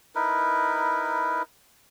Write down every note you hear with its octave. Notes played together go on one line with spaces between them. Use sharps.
D#4 E4 A#4 B4